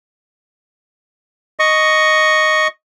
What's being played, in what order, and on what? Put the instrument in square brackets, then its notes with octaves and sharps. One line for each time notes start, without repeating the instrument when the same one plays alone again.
[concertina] D#5 C#6